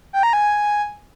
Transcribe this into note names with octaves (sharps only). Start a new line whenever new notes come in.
G5
A#5
G#5